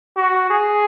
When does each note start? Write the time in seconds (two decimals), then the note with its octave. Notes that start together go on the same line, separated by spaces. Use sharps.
0.17 F#4
0.50 G#4